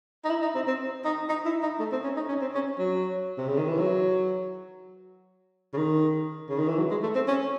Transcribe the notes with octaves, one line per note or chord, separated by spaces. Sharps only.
D#4
E4
D#4
C4
C4
D#4
D#4
E4
D#4
A3
C4
C#4
D#4
C#4
C4
C#4
F#3
C3
C#3
D#3
E3
F#3
C#3
D#3
C#3
D#3
E3
F#3
G#3
A3
C4
C#4